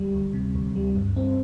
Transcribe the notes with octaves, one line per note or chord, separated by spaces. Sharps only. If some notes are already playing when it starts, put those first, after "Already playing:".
Already playing: D2 G3
D2
C3
D2
G3
G2
C4